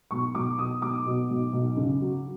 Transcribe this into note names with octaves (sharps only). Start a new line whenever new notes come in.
B1 C#6
B1 D6
B2 D#6
B1 D6
B2
B1
B1
C#3
F#3